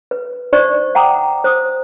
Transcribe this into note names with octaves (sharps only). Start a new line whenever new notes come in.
B4
D#4 C5 D5 C#6
F#5 G5 A#5 D6 D#6
C5 D#6